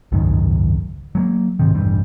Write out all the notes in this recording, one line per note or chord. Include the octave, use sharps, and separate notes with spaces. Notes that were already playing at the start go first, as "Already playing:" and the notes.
G#1 C#2 F#2 D#3
F#3 G#3 A#3
A1 G#2 C3 D#3
E1 A1 G2